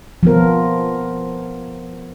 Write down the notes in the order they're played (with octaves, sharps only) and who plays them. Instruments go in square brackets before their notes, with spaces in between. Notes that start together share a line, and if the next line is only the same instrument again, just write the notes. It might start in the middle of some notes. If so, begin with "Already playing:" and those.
[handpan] F3 B3 A#4